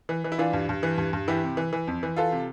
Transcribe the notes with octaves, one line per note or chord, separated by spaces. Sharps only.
E3
E3
E4
E3 D4 F4
G2
G2
E3
G2
G2
E3 E4 G4
C3
E3
E3
F2
E3
E3 F4 A4
C3